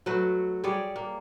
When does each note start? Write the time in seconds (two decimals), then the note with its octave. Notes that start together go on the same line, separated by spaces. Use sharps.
0.06 F#3 A3 F#4 B4
0.64 G3 G#4 C#5 D5
0.96 A#3